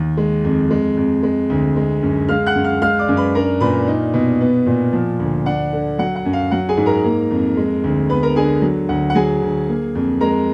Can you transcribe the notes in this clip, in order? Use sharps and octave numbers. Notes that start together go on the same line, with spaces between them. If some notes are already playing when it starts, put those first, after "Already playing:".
Already playing: D#2
G#3
F2
G#3
F2
G#3
D2
G#3
F#2
G#3 F5 F6
F#5 F#6
F#2
F5 F6
G#3 F5 F6
D5 D6
F#2
B4 B5
D4 A#4 A#5
A#2 B4 B5
D#4
B2
B3
A#2
F3
D2
D4 F#5
D3
F#3 F#5
F#5
F#2
F5
F#3 F#5
G#4 G#5
G#2
A#4 A#5
A#3
F2
G#3
D2
B3 B4 B5
A#4 A#5
D3 G#4 G#5
F#3
D2 F#5
F#5
F#3 G#4 G#5
D2
A#3
F2
G#3 A#4 A#5